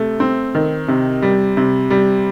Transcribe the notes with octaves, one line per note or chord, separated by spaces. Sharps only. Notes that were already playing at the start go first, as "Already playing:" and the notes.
Already playing: C3 A3
C4
D#3
C3
G3
C3
G3